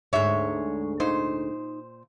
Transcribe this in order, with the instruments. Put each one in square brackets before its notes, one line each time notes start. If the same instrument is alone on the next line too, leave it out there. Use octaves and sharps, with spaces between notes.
[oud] D2 G#2 [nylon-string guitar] G#3 E5 [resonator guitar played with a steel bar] C#5
[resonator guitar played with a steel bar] A#2 C5 [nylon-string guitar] D#4